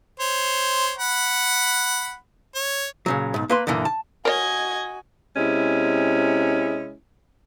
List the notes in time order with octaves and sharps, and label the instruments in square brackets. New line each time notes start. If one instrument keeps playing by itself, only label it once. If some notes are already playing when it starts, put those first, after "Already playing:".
[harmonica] C5 C#5
F#5 B5
C#5
[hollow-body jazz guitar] A#2 C#3 F#3
B1 G#2
A#3 B4 C6
F#2 A#2 D3 E3 A#3
A5
[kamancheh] F#4 G#5 [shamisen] A#4 C#5 [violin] D#5 G#6
[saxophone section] C3 G#3 C#4 E4